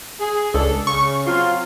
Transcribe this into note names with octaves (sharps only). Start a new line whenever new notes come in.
G#4
C#2 D4 A4
C#3 C#6
F#3 C4 F4